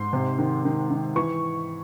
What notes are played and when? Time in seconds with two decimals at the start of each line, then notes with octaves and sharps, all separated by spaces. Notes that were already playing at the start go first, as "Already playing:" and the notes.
Already playing: G#2 C6
0.13 C3
0.39 D#3
0.65 D#3
0.91 D#3
1.16 E3 C#6